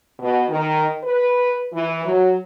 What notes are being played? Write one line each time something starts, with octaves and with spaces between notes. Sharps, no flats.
B2
D#3
B4
E3
F#3